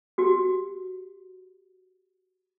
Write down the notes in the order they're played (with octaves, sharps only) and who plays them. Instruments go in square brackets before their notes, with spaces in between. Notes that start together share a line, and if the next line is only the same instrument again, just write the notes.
[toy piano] F#4 G4